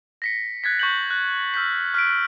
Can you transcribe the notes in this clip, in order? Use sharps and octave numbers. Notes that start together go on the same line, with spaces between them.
A#6 B6 C#7
F#6 G#6 A6 B6
C#6 G6 F#7
F#6
E6 F6 G6 B6
F6 B6 D7